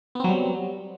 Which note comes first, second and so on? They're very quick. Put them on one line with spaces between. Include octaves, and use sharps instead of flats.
B3 C4 F#3 G3